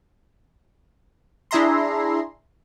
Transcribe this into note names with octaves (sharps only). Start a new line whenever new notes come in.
D4 E4 G#4 E5 A#5 C6